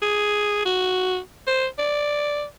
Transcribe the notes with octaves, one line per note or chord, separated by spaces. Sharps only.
G#4
F#4
C5
D5